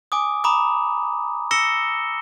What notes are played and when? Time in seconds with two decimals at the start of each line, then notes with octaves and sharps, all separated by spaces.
0.12 G#5 D6 D#6
0.44 A#5 B5 D6 D#6
1.51 E6 A#6 C#7 E7 G7